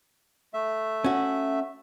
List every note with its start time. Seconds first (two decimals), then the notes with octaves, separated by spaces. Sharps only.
0.54 A3 E5
1.04 C#4 F#4